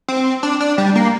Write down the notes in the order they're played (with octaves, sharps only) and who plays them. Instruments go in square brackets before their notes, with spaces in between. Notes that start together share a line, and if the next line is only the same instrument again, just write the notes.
[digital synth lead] C4
D4
D4
G3
A#3